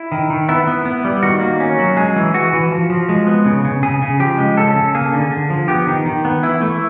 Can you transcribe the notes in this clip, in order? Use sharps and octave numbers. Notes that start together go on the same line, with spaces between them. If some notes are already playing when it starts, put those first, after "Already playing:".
Already playing: E4
D#3
D#3
B3 E4
B3
B3
G3
D#3 F#4
A#3
C#4
F#3
G#3 G#4
E3
E3 F#4
E3
F3
F3
G#3
B3
C#3
C#3
C#3 G#4
C#3
F3 G4
G#3
C#3 A4
C#3
A#3 G#4
D3
D3
F3
B3 G4
D#3
D#3
B3
E3 E4
A3